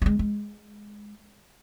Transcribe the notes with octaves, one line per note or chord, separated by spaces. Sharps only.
G3 G#3
G#3